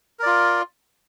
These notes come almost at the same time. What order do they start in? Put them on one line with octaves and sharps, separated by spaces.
A#4 D5 F4